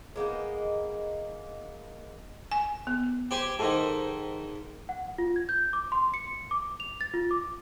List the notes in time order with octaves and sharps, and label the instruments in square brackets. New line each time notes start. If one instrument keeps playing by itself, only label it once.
[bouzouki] G#3 A#3 B3 D#4
[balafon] G#5
B3
[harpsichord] G4 C5 G#5
[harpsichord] G#2 D#3 [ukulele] A4 A#4 C5
[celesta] F#5
F4
G#6
G6
D6
C6
C#7
D6
F7
A6
F4
D6